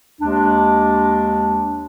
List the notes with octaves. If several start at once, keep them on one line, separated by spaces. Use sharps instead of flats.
D#2 G#3 D4